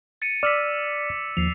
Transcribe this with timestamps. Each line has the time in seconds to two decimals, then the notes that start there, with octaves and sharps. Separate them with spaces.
0.22 A6 C#7 D#7
0.43 D5 D6 E6 F6 B6
1.37 D#2 F3 C7 F7